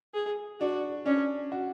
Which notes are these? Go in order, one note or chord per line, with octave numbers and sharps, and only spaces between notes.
G#4
D4 F#4
C#4 D4
F#4